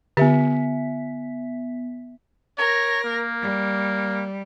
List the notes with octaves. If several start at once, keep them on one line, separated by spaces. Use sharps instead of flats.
D3 B3 G4 E5 B6
A#4 C#5 A#6
A#3
G3